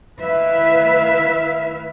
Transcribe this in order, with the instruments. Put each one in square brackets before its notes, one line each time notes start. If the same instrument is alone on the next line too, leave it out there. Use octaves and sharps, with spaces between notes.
[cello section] D#3 A3 E4 B4 E5 F5